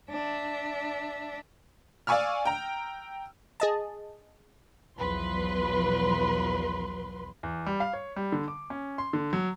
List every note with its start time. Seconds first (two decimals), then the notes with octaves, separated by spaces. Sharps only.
0.11 D4 E5
2.07 D5 F5 G#5 C#6 E6 F6
2.45 G5 A#5
3.60 G#4 D#5 A5
4.98 B1 E2 F3 F#3 B4 C6
7.43 E2
7.66 G3
7.80 F5
7.93 C#5
8.16 G3
8.32 D3
8.48 D6
8.70 C#4
8.98 C6
9.13 D3
9.33 F#3